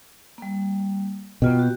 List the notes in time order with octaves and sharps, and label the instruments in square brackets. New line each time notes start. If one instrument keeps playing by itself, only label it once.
[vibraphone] G3 A#3
[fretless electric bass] B2 [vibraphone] A#3 F4 G5
[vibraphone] F#4 G4